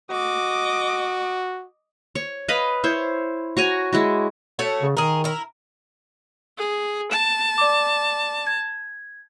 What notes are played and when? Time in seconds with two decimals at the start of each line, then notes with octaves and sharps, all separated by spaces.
0.11 F#4 D#5 D6
2.15 C#5
2.48 B4 D#5 F5 B5
2.84 E4 C5 C#5
3.57 F#4 C#5 G#5 A#5
3.93 G#3 E4 F#4
4.59 A3 F#4 C#5
4.82 C#3
4.97 D#3 G#4 A#4
5.24 E4 A#4
6.58 G#4
7.11 A5 E7
7.58 D5 D6
8.47 G#6